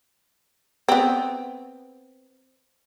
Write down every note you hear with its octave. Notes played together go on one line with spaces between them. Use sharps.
B3 C4